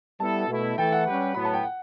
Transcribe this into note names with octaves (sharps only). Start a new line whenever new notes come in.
G3 B3 E4 A4 A5
B2 A3 E4
E3 A3 E4 A4 G5
F#5
G3 C#4 G4 B4
A2 F#3 B3 B5
A5
G5
F#5